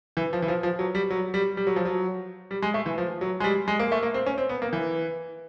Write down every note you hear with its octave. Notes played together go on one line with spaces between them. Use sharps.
E3
F3
E3
F3
F3
F#3
G3
F#3
G3
G3
F#3
F3
F#3
G3
G#3
A3
E3
F3
F#3
G#3
G3
G#3
A#3
A3
A#3
C4
C#4
C4
B3
A#3
E3